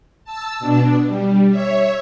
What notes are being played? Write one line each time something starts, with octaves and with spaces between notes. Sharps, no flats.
A5 E6
B2 D4
G3
C#5 E5